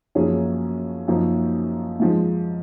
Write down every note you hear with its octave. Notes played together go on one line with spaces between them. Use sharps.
F#2 F3 A#3 C#4 G#4
F#2 F3 A#3 D#4
G#2 F3 G#3